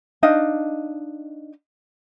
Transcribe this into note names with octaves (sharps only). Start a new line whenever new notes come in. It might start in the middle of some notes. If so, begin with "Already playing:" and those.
D4 D#4 D#5 F5